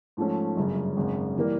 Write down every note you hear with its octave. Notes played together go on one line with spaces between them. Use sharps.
G#2 F3 A3 C#4
G1 F#2 C#3
G#1 F#2 C#3
E3 G3 A#3